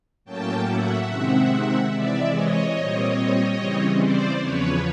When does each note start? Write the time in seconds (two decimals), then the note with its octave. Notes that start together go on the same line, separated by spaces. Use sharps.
0.25 A2 F#3 A#3 C#4 G5 A5
0.66 E5 F#5
1.08 C3 D#3 G#3 C4
1.91 C3 E3 G#3 D5 E5
2.32 C#5 D#5
2.74 A#2 G3 C4
3.57 C#3 E3 G3 C4
3.99 C5 D5
4.40 E2 C#3 F3 B4 C#5